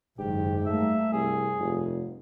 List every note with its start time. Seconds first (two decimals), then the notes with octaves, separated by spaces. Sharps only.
0.19 F#1 G#2 D#3 G4
0.66 G3 A3 A#3 E5
1.12 C2 G2 G#4
1.59 F1